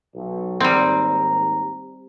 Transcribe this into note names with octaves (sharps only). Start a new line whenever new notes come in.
B1
D#2 G#2 G3 C4 A#5